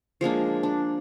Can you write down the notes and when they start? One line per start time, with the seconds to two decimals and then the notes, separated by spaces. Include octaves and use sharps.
0.21 F3 G#3 A#3 D4
0.63 D4